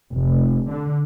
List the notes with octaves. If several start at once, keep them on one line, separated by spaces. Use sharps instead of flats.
F1
D3